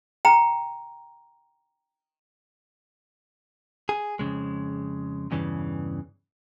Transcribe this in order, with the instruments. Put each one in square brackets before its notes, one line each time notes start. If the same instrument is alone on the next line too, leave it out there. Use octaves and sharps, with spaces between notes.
[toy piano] G5 A#5
[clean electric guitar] G#4
F2 A#2 C#3 G#3
E2 G2 C#3 E3